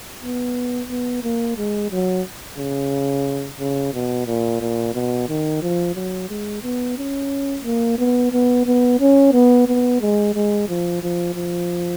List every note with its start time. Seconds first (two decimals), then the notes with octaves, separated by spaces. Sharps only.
0.21 B3
0.89 B3
1.23 A#3
1.57 G#3
1.91 F#3
2.58 C#3
3.59 C#3
3.94 B2
4.26 A#2
4.61 A#2
4.94 B2
5.28 D#3
5.62 F3
5.95 F#3
6.29 G#3
6.63 B3
6.97 C#4
7.64 A#3
7.98 B3
8.32 B3
8.66 B3
9.00 C#4
9.33 B3
9.67 B3
10.01 G#3
10.35 G#3
10.69 F3
11.03 F3
11.35 F3